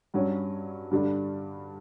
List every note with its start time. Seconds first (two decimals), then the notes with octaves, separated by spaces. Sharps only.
0.14 G2 F#3 C#4
0.91 G2 D3 G3 D4